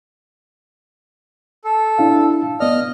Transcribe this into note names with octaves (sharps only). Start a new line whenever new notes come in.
A4
D4 E4 F5
B3 D5 D#5 F6